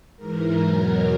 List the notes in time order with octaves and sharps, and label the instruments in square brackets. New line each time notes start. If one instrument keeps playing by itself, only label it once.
[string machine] G#2 E3 A#4
E2 B2 F#3